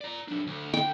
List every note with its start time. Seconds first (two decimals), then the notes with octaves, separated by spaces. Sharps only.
0.01 D5 A#5
0.28 F#3 D4
0.47 D2
0.74 G5